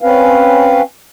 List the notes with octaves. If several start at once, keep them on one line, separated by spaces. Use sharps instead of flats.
C4 C#4 B4 F5